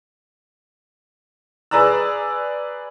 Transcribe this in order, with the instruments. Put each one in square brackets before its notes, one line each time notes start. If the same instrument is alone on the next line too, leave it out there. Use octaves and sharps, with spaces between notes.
[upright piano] G#4 B4 D5 A#5 E6